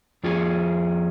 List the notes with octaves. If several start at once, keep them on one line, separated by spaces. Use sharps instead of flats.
F2 F4 G#4